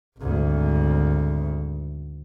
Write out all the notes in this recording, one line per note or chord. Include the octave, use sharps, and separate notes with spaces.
G#1 D2